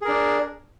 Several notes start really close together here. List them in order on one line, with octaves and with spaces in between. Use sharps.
G#4 A#4 D4